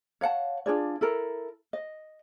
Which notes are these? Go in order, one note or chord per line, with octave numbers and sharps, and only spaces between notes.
C#5 F5 F#5 A5
D4 F4 G#4 D5
E4 A4 A#4
D#5